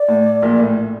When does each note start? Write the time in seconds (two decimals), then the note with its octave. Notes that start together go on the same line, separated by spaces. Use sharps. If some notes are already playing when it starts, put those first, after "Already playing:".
Already playing: D5
0.08 A2
0.42 A#1 A#2
0.59 A2